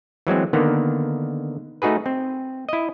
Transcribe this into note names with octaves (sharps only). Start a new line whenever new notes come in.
E3 F#3 G#3 C4
D3 D#3 A#3 B3
A3 D#4 F#4 G#4 B4
C4
E4 D#5